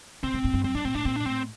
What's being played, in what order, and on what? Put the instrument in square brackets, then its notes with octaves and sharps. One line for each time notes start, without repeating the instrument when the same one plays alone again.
[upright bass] C3 [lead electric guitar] C4
[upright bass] C3
A2
G2
[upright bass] F#2 [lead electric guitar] C4
[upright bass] G2 [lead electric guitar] D4
[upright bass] A#2 [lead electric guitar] C4
[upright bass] A2 [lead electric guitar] D4
[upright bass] A#2 [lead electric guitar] C4
[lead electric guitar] D4
[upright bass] A2 [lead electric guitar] C4